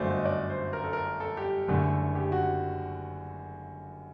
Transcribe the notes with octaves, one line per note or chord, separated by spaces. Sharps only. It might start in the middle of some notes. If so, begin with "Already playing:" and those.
Already playing: G1 F#2 F#3 A3 C5 D5
D#5
D5
C5
A#4
A4
A#4
A4
G4
F#1 F#2 D3 A3
G4
F#4